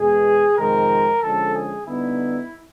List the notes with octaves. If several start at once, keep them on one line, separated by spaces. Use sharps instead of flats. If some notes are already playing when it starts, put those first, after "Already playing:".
Already playing: E2 B2 G#3 G#4
F2 C3 D#3 G#3 C4 A#4
D3 F3 G#3 C#4 A4
G#4
D3 G3 B3 D#4 E4